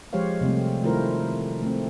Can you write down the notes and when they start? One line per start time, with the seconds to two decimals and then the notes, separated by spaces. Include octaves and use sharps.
0.13 F3 G#3 G4 C5 C#5 F5
0.41 C3 G3 A3 C4
0.83 D#3 A3 E4 F4 A#4 C5
1.62 A3 C4